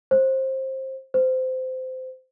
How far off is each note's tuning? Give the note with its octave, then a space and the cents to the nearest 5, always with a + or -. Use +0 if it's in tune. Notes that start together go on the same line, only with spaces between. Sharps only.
C5 +20
C5 -20